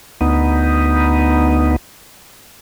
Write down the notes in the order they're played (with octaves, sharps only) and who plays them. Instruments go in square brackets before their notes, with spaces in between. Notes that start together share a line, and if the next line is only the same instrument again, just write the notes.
[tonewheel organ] D2 B3 D#4